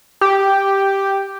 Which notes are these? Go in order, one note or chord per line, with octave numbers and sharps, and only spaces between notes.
G4